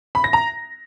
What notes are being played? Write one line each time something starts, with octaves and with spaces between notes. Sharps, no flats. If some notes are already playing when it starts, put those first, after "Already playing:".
B5
A#6
A#5